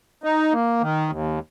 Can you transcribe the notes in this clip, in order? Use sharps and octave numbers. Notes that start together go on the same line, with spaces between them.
D#4
A#3
D#3
D#2